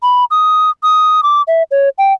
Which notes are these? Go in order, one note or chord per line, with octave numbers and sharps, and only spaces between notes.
B5
D#6
D#6
D6
E5
C#5
G5